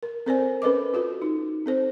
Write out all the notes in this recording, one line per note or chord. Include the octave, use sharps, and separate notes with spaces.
A#4
C4 A4 A#4 C5 D5 G#5
C#4 A4 B4 D#5 D6
F4 F#4 A4
D#4
C4 A4 C5